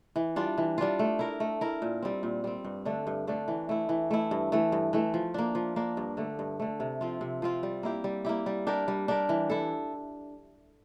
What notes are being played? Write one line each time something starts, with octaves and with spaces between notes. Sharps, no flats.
E3
G3 D4 F4
E3
G3 D4 F4
A3
E4 A#4
A3
E4 A#4
A#2
G3 C4
A#2
G3 C4
G2
D3 A3 D4
G2
D3 A3 D4
E3
A3 E4
E3
A3 E4
G2
E3 A3
G2
E3 A3
F3
A#3 D4
F3
A#3 D4
G2
D3 A3
G2
D3 A3
C3
F3 C4 F4
C3
F3 C4 F4
G3
A#3 E4 G4
G3
A#3 E4 G4
G3
D4 G4 A#4
G3
D4 G4 A#4
E3
E4 A4